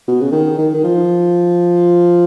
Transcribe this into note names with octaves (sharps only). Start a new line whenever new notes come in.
B2
C#3
D#3
D#3
D#3
F3